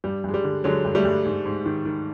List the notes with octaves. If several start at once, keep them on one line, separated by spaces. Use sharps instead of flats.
G2 G3
G2 G#3
G3
D3
D3 F#3 G#3
G2
G3 A3
G2
G#2
G#2
D#3
D#3